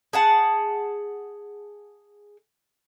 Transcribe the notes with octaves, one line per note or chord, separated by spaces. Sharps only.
G#4 F#5 A5